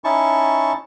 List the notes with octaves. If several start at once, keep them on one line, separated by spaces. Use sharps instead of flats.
C#4 D#4 E4 A5 C#6